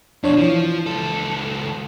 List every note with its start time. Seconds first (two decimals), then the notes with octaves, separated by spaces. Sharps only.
0.24 F2 B2 D4 C#5
0.38 E3 F3
0.87 C#2 A4